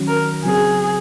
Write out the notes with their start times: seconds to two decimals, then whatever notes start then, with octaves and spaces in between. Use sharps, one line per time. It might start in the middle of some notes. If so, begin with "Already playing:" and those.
Already playing: D#3 F#3 C#4 F#4
0.08 A#4
0.45 C#3 F#3 C4 G#4